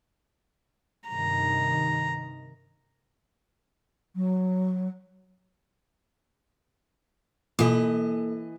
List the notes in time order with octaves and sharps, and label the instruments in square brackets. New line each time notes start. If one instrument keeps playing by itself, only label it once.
[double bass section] G2 C3 D#3 [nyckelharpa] A#5
[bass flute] F#3
[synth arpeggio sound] B2 F4 D6 [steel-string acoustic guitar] E3 D#5 [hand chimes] A#3 A4